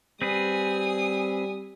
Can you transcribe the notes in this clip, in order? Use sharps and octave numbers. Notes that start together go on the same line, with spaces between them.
G3 C4 G#4 B4 G#5 D#6